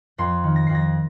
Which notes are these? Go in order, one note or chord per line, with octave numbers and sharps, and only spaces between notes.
F2 C6
D#3
A#6
F2 C7
A#6